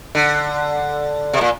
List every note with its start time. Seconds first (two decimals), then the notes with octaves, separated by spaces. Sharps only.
0.15 D3
1.34 C3
1.41 A#2